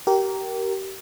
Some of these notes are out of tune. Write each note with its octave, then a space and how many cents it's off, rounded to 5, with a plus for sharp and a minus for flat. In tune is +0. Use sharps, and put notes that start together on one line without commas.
G4 -25 A#4 +0